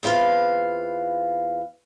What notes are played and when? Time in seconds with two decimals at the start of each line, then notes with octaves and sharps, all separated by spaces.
0.03 E2 C4 F4 B4 F5